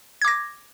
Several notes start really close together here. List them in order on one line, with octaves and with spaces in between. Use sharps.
G#6 D6 A#6